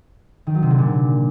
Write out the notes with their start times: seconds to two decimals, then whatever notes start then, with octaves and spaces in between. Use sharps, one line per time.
0.47 D#3
0.55 F#3
0.63 C3
0.70 D3
0.78 A#2